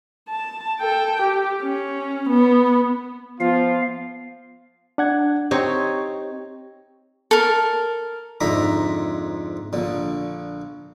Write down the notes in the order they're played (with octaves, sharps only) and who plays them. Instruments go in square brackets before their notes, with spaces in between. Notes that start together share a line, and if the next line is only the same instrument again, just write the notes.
[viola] A5
A4 G5
G4
C#4
B3
[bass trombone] F3 [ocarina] B3 [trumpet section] F4 [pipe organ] F5
[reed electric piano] D4 F#5 G#6
[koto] C4 D#4 C#5 [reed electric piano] G4
[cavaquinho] A4 A#4
[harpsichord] F2 G#2 D3 E5 A#5 B5
A#1 D3